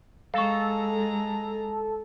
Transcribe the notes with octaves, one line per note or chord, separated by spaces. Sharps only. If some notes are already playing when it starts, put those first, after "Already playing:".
G#3 A4 F5 A#5 C#6